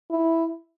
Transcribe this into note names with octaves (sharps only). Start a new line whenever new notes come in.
E4